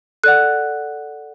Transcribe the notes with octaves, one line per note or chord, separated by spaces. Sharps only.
A4 D5 F#5 F#6